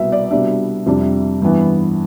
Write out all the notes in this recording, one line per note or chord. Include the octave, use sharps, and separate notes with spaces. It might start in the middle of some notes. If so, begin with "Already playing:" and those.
Already playing: C2 B2 B3 E5
D5
C2 B2 G3 B3 D4 E5
F2 C3 G3 D4
G2 E3 B3